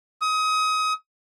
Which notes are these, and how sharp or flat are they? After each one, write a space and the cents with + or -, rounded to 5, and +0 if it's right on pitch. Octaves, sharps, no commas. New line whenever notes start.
D#6 +30